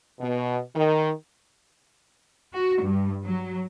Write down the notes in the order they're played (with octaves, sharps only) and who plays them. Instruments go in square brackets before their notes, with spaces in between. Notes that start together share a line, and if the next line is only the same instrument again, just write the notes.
[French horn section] B2
D#3
[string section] F#4
G2
F#3